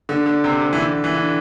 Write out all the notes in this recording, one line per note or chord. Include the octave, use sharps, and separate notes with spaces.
D3
D3
C3
C3
E3
D3
E3
D3